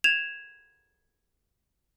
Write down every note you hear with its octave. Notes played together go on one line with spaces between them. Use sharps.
G#6 E7 F7